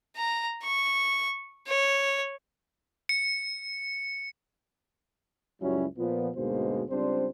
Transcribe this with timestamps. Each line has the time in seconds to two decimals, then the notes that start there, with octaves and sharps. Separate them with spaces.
0.17 A#5
0.63 C#6
1.67 C#5
3.09 C#7
5.61 C#2 F#2 F#3 G3 C#4 E4
5.98 A#2 F3 B3
6.35 D2 G#2 B2 G#3 A#3 C5
6.90 C#2 G3 C4 D4 C5